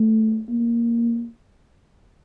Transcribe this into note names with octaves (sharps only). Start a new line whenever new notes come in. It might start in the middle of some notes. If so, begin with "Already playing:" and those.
Already playing: A3
A#3